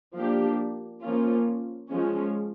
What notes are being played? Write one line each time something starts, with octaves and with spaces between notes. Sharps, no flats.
F3 A#3 D4 G4
F3 A#3 C#4 F4
F3 G#3 C#4